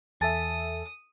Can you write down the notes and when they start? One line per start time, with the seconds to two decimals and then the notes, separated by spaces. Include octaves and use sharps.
0.21 E2 A4 E5 G#5 A5 D#6 A6